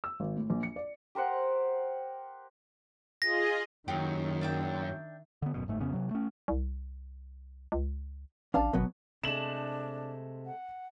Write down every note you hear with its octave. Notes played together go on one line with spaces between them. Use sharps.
E6
G#1
A2
A#1
C#7
D5
G4 A#4 C5 F#5
F4 G#4 D#5 A#6
F#1 F#2 D#3 D#4 G4
D4 E5 G5
D3 B3
D#1 F#2 B2
G1 G#2 A3
F2 C#3 B3 C#4
C3 F#3
A3 C#4
C2
C#2
A1 D4 F5 A5
G#1 B2 F#3 B3
C3 G#3 A3 D4 E7 F#7
F#5